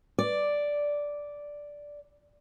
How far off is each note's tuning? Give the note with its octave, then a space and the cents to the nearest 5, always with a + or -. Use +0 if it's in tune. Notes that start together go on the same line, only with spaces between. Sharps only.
D5 -5